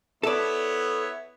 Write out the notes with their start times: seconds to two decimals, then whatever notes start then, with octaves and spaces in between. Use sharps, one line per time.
0.23 B3 E4 A4 C#5 D5